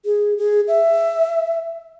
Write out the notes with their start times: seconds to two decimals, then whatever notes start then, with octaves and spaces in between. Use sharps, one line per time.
0.05 G#4
0.38 G#4
0.68 E5